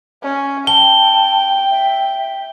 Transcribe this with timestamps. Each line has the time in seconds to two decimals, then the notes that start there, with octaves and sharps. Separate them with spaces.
0.23 C#4
0.67 G5 A5 G7
1.71 E5